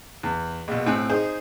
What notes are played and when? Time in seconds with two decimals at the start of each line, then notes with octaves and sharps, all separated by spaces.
0.23 E2
0.68 A#1 B2
0.86 A2 C4 G#5 F#6
1.09 D#4 G#4 C5